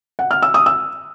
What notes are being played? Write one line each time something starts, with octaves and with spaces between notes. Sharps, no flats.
F#5
F6
E6
D#6
E6